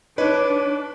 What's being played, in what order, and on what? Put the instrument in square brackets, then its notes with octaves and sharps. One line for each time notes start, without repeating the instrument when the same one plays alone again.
[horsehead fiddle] D4 [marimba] D#4 D#5 [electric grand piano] B4 [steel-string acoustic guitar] C#5